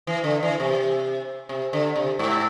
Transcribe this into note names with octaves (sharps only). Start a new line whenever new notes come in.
E3
D3
E3
C3
C3
D3
C3
G#2